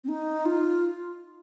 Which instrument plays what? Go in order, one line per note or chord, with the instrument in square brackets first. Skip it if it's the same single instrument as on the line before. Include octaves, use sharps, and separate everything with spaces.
[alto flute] C4
D#4
F4